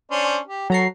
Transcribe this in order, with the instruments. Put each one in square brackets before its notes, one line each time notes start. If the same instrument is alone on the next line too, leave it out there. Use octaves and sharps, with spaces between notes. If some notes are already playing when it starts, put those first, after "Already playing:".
[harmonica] C#4 D4 C5
G4
[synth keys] F#3 A#5 C7 [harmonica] F#4 A4